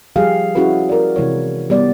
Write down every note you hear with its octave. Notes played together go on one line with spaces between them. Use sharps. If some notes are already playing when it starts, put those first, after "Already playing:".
F3 G3 G4 G#4 F5
C#4 E4 F#4 G#4 B4
A#4 D5
C3 E3 G#3 C#5
G3 B3 D5